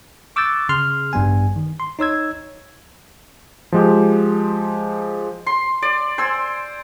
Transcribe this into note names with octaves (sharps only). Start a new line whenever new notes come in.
C#6 D6 E6 F#6 G6 A6
C#3 G#4 C6 F6
A1 G2 G3 B3 G#5
D#3
C6
D#4 C#5 E6 G#6
F3 G#3 G4
C6
D5
C5 G#5 E6